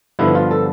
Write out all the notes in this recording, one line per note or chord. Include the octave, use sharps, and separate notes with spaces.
G2 D3 F3 B3 E4
F4
A4